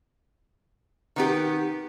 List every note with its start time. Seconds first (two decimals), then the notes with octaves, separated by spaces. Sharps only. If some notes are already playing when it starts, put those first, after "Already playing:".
1.16 D#3 B3 G4